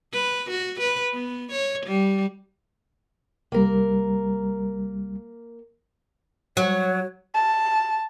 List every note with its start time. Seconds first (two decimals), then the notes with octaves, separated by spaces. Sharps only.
0.13 B4
0.50 F#4
0.80 B4
1.13 B3
1.52 C#5
1.86 G3
3.52 C2 G3 A#3 A#4
6.57 F#3 C#5
7.34 A5